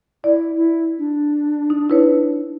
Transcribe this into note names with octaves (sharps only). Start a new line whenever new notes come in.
E4 D5
E4
D4
D#4
E4 B4 C#5